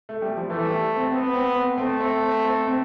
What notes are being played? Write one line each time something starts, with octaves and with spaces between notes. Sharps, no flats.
A3
G3
F3
E3 A3
G3
C4
B3 C4
C4
C4
A3 C4
C4
C4
C4
C4